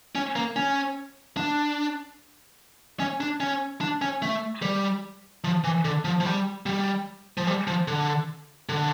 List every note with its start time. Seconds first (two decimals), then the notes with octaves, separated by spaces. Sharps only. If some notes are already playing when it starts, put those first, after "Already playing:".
0.15 C#4
0.36 A#3
0.56 C#4
1.37 D4
3.00 C#4
3.20 D4
3.40 C#4
3.81 D4
4.02 C#4
4.22 A3
4.62 G3
5.44 F3
5.64 E3
5.85 D3
6.05 F3
6.20 F3
6.25 G3
6.66 G3
7.37 F3
7.47 G3
7.67 F3
7.88 D3
8.69 D3